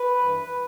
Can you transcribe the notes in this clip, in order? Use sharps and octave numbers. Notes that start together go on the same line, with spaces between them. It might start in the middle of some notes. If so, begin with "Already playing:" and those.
Already playing: B4
G2 E3